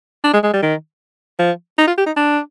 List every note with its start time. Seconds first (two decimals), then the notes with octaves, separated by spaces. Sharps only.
0.24 D4
0.33 G#3
0.44 G#3
0.53 G3
0.62 D#3
1.39 F3
1.78 D#4
1.87 F4
1.98 G4
2.06 D#4
2.16 D4